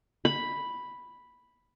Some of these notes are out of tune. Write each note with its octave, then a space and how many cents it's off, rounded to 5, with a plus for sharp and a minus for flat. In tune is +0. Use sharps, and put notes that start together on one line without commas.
B5 +0